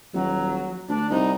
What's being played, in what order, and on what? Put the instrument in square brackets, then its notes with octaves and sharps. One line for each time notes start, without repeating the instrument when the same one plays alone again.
[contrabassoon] D#1 [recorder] F#3
[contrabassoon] D2 [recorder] D4
[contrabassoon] C2 [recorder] D#4